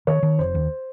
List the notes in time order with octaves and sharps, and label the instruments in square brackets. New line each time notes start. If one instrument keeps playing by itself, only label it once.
[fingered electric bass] D#3 [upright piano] C#5
[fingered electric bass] D#3
[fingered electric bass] F1 [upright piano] C5
[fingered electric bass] D#2